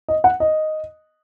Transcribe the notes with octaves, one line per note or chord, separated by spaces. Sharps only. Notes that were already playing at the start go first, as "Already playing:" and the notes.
D#5
F#5
D#5